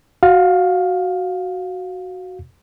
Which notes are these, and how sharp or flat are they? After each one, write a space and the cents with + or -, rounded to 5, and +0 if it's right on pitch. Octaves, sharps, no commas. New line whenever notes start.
F#4 +0 F5 +15